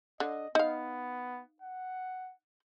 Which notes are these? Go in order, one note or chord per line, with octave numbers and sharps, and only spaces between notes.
D3 D#5
B3 D#4 F5
F#5